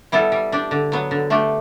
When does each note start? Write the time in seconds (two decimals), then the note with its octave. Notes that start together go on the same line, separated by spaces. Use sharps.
0.12 G3 B3 E4 A4
0.32 G3
0.52 D4 G4
0.71 D3
0.92 F#3 B3
1.11 D3
1.30 A3 D4 G4